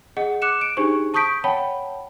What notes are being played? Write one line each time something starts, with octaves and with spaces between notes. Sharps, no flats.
G#4 D#5 F#5
D6 F#6 C#7 E7
D7
D4 D#4 G4 G#4 C5 C#6
A5 C#6 D#6 G6 B6 D7
C#5 F#5 G5 A5 B5